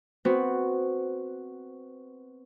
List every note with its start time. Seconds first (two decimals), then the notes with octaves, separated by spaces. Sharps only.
0.25 B3 C4 F#4